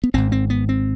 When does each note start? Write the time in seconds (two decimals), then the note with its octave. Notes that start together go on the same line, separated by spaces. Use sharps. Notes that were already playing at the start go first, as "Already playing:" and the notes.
0.04 B3
0.14 G#1 G#2 C4
0.32 C4
0.50 B3
0.69 C4